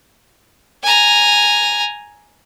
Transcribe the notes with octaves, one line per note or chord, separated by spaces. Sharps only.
G#5 A#5